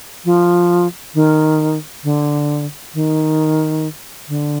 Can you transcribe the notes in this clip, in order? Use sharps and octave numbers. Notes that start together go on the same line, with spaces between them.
F3
D#3
D3
D#3
D3